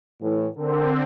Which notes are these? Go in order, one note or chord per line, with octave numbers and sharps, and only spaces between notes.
A2 E3
D3 C4 A#4